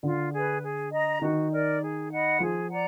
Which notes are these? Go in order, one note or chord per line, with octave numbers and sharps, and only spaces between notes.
D3 D4 F4
G#4 B4
G#4
D#5 A#5
D#3 D#4 F#4
A#4 D5
G#4
D#5 F#5 B5
F3 F4 G#4
D5 F#5 A#5